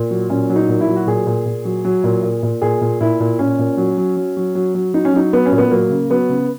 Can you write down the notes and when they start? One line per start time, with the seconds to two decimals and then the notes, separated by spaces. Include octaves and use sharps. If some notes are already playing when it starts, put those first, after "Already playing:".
Already playing: A#2
0.11 F#3
0.30 A#2 C#4
0.50 F#3
0.56 D#4
0.69 A#2
0.81 E4
0.88 F#3
0.96 F#4
1.07 A#2 G#4
1.27 A#2
1.46 A#2
1.65 F#3
1.85 F#3
2.04 A#2
2.23 A#2
2.43 A#2
2.62 A#2 G#4
2.81 A#2
3.01 A#2 E4
3.20 A#2
3.39 A#2 C#4
3.59 A#2
3.77 F#3
3.98 F#3
4.17 F#3
4.37 F#3
4.55 F#3
4.75 F#3
4.94 F#3 D#4
5.05 C#4
5.14 F#3 D#4
5.33 F#3 B3
5.46 C#4
5.52 A#2
5.58 B3
5.71 F#3 A#3
5.90 C#3
6.10 F#3 B3
6.29 C#3